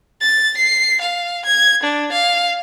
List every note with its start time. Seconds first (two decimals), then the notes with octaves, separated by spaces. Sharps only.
0.21 A6
0.57 C7
1.01 F5
1.45 G#6
1.83 D4
2.12 F5